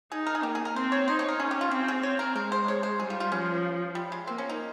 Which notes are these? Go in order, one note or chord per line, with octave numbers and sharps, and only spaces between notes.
D#4 G#4
A#4
G#4
A#3 G4
G#4
A#4
C4 C5
C#5
D#4 C5
C#5
A#4
C#4 G#4
G4
F4
C4 G4
G#4
C4 C#5
A#4
G#3 A#4
C5
C#5
C5
G3 G#4
F4
F4
F3 C#4
G3
G#3
A#3 C4
C#4
D#4